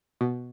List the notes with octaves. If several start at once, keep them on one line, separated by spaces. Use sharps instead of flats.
B2